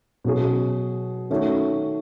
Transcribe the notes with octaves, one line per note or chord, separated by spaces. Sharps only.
B2 F#3 C#4 G#4
D#3 A3 C#4 F#4